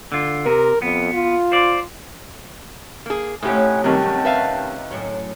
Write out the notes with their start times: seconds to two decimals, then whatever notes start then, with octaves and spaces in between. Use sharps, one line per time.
0.12 D3 F4
0.46 C3 A#4
0.82 F2 B3
1.13 F4
1.52 C5 D5
3.06 A#3 G#4
3.42 A2 A3 C4 C#4 D#4 G4 F#5 G#5
3.84 C3 D#3 F#3 G3 F#5 G5 A5
4.25 B4 E5 F5
4.91 F#2 A2 F#3